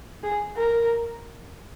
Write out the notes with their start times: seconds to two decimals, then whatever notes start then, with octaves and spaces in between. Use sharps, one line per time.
0.23 G#4
0.57 A#4